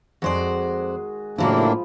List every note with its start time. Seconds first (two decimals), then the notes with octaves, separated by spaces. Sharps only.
0.22 F2 D#3 G#3 F#4 C5 D5
1.38 A2 C#3 F3 F#3 A#3 D4 E4 B5